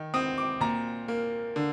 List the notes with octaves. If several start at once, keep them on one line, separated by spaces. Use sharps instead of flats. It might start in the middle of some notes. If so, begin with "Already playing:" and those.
Already playing: D#3
C4 D#6
D6
A#2 A#5
A#3
D3